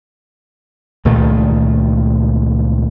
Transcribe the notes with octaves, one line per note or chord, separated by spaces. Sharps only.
C#2 A#2 D#3 A3